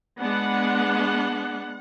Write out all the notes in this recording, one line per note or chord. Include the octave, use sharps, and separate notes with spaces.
G#3 B3 D4 F#5